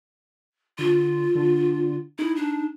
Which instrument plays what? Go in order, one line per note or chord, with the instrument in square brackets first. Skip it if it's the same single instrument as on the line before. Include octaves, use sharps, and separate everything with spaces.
[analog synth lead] D3 [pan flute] F4
[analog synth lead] D3
[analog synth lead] D#4 [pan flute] E4
[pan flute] D4